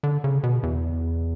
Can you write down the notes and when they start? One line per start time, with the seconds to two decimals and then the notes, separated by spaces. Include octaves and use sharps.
0.03 D3
0.24 C#3
0.43 B2
0.63 E2